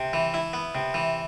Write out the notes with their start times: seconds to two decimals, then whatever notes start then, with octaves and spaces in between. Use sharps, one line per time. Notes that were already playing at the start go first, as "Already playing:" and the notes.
Already playing: C3
0.13 E3
0.34 E4
0.53 B3
0.75 C3
0.94 E3